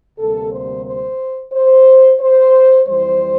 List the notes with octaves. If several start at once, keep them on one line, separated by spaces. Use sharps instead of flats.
D2 C3 G3 A#3 A4
C5
C5
C5
C5
F2 E3 G3 C5